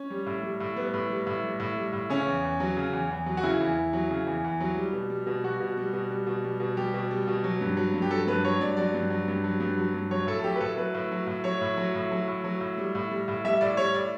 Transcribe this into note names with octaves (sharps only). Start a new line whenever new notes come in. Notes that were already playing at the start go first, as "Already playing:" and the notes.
Already playing: C#4
G3
A2
G3
A2
G3 B3
A2
G3
A2
G3
A2
G3
A2
C#3 C#4
E2
E2
F#3
C#3
E2
E2
F#3
F#4
C#3 E4
E2
E2
F#3
C#3
E2
E2
F#3
G3
B2
G3
B2
G3 F#4
B2
G3
B2
G3
B2
G3
B2
G3 G4
B2
G3
B2
F#3
G2
F#3
G2
G4
F#3 A4
G2 B4
F#3 C#5
G2 D5
F#3 D5
G2
F#3
G2
F#3
G2
F#3
G2
F#3 C#5
A2 A4
A4
F#3 G4
B4
A2 A4
F#3 B4
A2
F#3
A2
F#3 C#5
A2
F#3
A2
F#3
A2
F#3
A2
G3
A2
G3
A2
G3 E5
A2 D5
G3 C#5
A2 D5